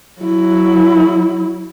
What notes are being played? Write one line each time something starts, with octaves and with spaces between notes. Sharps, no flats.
F#3 E4